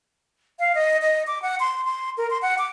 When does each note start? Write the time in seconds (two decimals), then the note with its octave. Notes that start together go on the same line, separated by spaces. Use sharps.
0.59 F5
0.75 D#5
1.02 D#5
1.27 D6
1.42 F#5
1.60 C6
1.85 C6
2.17 A#4
2.30 C6
2.42 F#5
2.58 D6